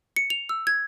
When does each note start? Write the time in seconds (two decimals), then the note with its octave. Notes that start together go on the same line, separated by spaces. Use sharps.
0.16 C#7
0.30 F7
0.49 E6
0.67 G#6